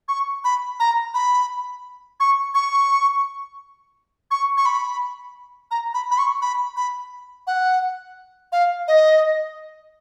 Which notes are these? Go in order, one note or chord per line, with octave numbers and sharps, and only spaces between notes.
C#6
B5
A#5
B5
C#6
C#6
C#6
C#6
B5
A#5
B5
B5
C#6
B5
B5
F#5
F5
D#5